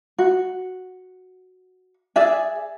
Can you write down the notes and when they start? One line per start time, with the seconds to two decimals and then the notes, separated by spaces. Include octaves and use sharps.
0.18 F#4
2.16 G#4 D5 E5 G#5